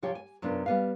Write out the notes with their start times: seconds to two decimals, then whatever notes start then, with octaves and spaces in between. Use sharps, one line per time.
0.02 C3 F3 G4 C#5 G5
0.15 G#5
0.42 F#2 C3 B3 D4 F4
0.66 G3 B3 F5